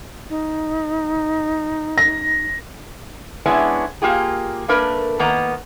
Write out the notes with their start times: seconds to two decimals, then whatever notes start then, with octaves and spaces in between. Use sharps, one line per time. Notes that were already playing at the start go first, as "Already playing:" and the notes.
0.30 D#4
1.98 A#6
3.46 G#3 B3 C#4 D4 E4
4.02 A#3 F4 G4 G#4
4.68 A3 A#3 D4 A#4 B4
5.19 D#3 A#3 B3 A#5